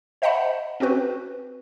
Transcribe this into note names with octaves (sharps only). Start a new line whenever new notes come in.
C5 D#5 E5 F#5 A5 B5
C4 C#4 F#4 B4